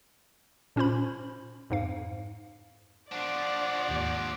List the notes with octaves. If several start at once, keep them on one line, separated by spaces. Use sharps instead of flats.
A#2 C#4 F4 C5 B5
F2 G#2 F5
F3 D4 C5 D5 F#5
D#2 G#2